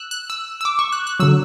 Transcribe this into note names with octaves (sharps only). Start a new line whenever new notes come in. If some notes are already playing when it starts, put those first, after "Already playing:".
Already playing: E6 F#6
F#6
E6
E6
D6
C#6
F#6
F#6
D3 F#3 E6